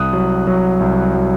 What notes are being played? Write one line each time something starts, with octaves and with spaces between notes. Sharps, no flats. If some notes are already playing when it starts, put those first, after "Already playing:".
Already playing: C2 D#6 F#6
F#3
F#3
C2
F#3